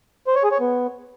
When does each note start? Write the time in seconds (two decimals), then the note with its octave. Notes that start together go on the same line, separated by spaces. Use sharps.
0.27 C5
0.36 C#5
0.44 G#4
0.52 C#5
0.60 B3